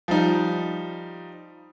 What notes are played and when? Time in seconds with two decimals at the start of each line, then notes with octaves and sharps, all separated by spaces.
0.08 F3 G3 D#4